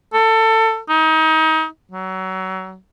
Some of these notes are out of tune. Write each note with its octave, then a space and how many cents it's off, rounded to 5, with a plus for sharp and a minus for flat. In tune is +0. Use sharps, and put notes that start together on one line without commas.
A4 +25
D#4 +30
F#3 +30